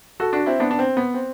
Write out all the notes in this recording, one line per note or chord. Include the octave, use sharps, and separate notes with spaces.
F#4 A4
D4 F#4
C4 E4
B3 D4
D4
C4
B3
C4